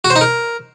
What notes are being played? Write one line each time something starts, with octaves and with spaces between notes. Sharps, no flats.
F#4
C5
D#4
A#4